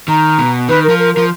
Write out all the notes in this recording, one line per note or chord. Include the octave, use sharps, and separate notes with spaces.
D#3 A#5
B2
D#3 B4
A#4
F3
A#4
F3 A#4